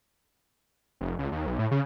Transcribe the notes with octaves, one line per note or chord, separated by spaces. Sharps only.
F1
C#2
D#2
B1
A2
C#3